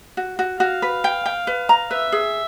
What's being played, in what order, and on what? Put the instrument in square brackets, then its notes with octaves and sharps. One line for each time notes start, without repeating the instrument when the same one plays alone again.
[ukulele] F#4
F#4
[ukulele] F#4 [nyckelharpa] F5
[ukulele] B4
G5
G5
B4
A#5
[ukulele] B4 [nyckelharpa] E5
[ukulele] G#4